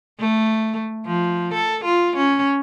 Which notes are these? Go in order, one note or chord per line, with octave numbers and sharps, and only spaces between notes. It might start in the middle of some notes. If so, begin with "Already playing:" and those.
A3
F3
A4
F4
C#4